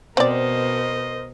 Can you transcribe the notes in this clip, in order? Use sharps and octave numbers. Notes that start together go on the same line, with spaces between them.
B2 C4 A#4 C5 D5 D#5